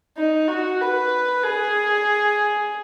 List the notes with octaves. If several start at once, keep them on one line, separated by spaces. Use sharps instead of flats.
D#4
F#4
B4
G#4